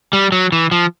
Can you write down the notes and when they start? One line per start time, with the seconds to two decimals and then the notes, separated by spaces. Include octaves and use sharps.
0.13 G3
0.32 F#3
0.52 E3
0.71 F3